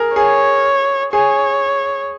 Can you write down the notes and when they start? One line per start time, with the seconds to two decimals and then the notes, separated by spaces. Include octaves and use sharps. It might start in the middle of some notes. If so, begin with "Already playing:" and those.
Already playing: G#4 A#4
0.16 G#4 C#5
1.13 G#4 C#5